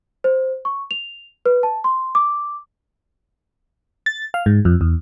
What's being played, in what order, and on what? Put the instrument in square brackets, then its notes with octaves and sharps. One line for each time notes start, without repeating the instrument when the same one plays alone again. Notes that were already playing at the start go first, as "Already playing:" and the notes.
[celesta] C5
C#6
F7
B4
A5
C6
D6
[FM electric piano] A6
F5
G#2
F2
E2